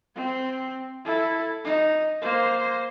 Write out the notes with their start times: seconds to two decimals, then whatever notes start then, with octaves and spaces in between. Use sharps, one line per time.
0.15 C4
1.05 E4 A4
1.65 D#4
2.22 A#3 C5